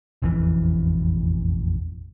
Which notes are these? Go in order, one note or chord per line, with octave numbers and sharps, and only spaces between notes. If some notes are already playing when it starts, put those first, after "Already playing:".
E1 A1 F2 E3